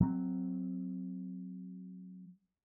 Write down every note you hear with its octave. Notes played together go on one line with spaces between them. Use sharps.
F#3 C4